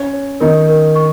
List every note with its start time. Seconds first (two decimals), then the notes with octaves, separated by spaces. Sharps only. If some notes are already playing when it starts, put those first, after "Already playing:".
Already playing: C#4
0.13 C#5
0.40 D#3 D#4 A#4
0.68 A#4
0.95 C#6